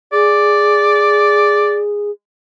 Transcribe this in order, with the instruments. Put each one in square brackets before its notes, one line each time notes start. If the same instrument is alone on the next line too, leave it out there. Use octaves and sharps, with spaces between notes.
[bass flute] G#4 [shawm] D5